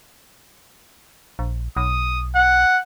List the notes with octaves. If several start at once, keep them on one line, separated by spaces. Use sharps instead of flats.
A#1
B1 D#6
F#5